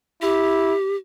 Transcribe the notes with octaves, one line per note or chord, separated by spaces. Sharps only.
E4 G4